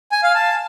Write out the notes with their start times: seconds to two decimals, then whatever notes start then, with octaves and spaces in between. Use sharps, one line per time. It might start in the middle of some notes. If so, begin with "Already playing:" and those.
0.12 G#5
0.23 F5
0.35 A5